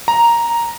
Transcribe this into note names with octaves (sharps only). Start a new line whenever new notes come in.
A#5